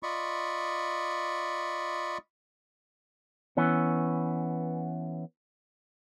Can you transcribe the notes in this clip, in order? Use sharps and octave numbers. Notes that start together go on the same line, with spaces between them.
F4 D5 D#5 B5 C#6
E3 B3 C#4